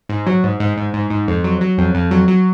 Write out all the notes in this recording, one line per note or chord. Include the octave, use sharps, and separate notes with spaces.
G#2
F#3
G#2
G#2
G#2
G#2
G#2
F2
F#3
F#3
F2
F2
F#3
F#3